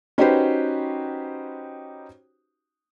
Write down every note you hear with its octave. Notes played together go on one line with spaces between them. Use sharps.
C#4 D#4 F#4 G4 B4 C5